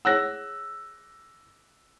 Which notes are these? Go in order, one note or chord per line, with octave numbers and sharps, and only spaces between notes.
G#4 C#5 F#5 E6 F#6 A#6